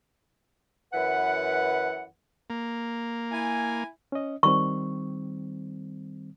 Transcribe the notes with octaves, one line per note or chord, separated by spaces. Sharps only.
F#2 E3 B4 F#5
A#3
E4 G#5
C#4 D#5
D#3 G3 C4 C#6